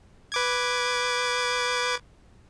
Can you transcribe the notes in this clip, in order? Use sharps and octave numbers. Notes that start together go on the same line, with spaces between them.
B4 D6 G#6